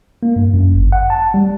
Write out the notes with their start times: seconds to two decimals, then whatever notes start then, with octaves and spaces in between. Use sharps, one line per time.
0.23 A#3
0.36 G2
0.54 F#2
0.73 G1
0.92 F#5
1.10 A5
1.34 G3